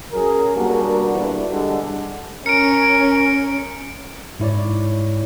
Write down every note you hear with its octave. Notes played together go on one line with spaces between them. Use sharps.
F#2 F#3 G#4 A#4
G3 A#3 B3 D4 F#4
G2 B2 D3 E3
D3 G3 G#3 D4
C#4 A#4 C#7 D7
G#2 E4 C#5 D5